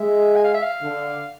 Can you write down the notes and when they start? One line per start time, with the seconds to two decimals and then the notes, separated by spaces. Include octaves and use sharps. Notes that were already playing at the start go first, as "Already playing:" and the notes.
Already playing: G#3 E5
0.36 G#5
0.44 F5
0.54 E5
0.63 F5
0.81 D3